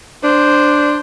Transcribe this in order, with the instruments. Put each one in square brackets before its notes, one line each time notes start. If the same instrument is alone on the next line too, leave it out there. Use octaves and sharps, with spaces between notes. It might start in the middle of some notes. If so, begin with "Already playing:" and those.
[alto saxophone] D4 [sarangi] C5